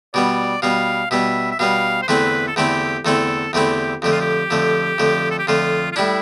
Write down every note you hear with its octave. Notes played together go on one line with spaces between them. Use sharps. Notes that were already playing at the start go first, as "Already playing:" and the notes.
B2 G3 B3 D5
B2 G3 B3 F5
B2 G3 B3 E5
E5
B2 G3 B3 F5
C5
E2 D3 A3 C4 E4 B4
A4
E2 D3 A3 C4 E4 G4
E2 D3 A3 C4 E4 A4
E2 D3 A3 C4 E4 G4
F2 D3 A3 G4
F4
G4
F2 D3 A3
F2 D3 A3
A4
G4
F2 D3 A3 F4
F4
A2 G3 D4 E4